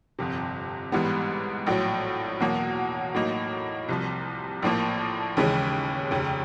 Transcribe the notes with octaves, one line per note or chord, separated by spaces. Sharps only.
G1 F2 C3
A1 G#2 E3 G3 B3
A#1 A2 F#3
E2 B2 F#3 A#3
A2 F#3 A#3 D#4
C2 C3 F3
A#1 A2 F3 A#3
D#2 C#3 E3 G#3 C#4
F1 D#2 C#3